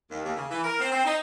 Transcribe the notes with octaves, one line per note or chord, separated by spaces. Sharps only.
D#2
D#2
C#3
E3
A#4
C4
C4
D#4